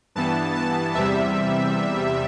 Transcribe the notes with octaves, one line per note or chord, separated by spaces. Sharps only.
G2 E3 B3 A5
A5
E2 C3 G3 E5